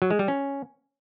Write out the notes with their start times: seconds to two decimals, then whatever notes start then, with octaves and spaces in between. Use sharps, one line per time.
0.02 F#3
0.10 G#3
0.19 G3
0.28 C#4